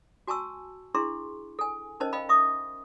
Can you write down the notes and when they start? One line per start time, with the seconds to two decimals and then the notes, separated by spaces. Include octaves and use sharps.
0.28 F#4 G#5 A5 C#6 E6
0.95 D4 E4 G#4 C6 C#6
1.59 A4 G#5
2.00 C#4 D#4 A#4 C5 D#5 A5
2.13 D#5 F5 G5 B5
2.29 E5 C#6 D#6